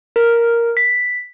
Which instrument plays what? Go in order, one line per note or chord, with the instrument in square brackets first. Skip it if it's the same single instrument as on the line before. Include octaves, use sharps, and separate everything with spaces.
[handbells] A#4
B6